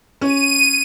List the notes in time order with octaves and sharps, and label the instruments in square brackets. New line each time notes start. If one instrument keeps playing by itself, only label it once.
[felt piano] C#4 [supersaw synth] D#7